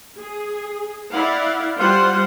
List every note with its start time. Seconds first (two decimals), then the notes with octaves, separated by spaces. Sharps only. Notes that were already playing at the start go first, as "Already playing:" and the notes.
0.19 G#4
1.13 E4 D5 F5 F#5
1.80 G3 F4 C5 F#5